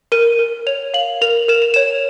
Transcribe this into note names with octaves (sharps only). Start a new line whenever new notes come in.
A#4 D#7
A#4
C#5 F7
F5 F#7
A#4 F7
A#4 E7
F7
C#5 E7